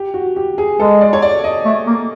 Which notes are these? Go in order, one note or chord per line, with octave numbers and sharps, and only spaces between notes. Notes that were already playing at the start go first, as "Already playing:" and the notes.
Already playing: G4
F#4
G4
G#4
G#3 A4
D5
C#5
D5
D#5
A3
A#3